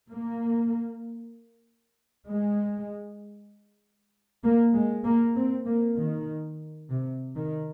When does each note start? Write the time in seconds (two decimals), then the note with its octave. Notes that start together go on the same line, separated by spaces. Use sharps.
0.12 A#3
2.28 G#3
4.44 A#3
4.74 G#3
5.05 A#3
5.36 C4
5.67 A#3
5.97 D#3
6.90 C3
7.36 D#3